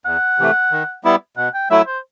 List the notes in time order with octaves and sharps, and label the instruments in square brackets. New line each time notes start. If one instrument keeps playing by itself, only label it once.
[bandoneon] E2 [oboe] F#5
[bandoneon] C3 E3 A3
D#3
G3 B3 E4
[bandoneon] B2 [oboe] F#5
[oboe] G5
[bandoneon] F#3 A3 E4 [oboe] E5
[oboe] C5